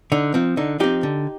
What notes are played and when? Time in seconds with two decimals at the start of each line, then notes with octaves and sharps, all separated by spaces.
0.12 D3 D#4
0.34 F3 C4
0.57 D3 D#4
0.80 F3 C4 D#4 G4
1.03 D3